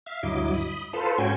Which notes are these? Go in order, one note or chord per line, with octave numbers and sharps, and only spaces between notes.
E5 F5
D2 G2 F#3 E4 D#5 D6
B5 D#6
F4 A4 B4 C5
G#2 C#4 F#4 G5 G#5